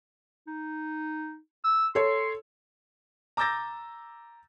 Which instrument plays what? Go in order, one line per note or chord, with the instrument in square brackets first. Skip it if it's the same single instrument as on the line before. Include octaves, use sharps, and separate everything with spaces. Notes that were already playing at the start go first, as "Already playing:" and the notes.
[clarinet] D#4
E6
[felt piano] A4 C#5 [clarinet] C6
[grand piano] A#5 D6 E6 G6 A6 A#6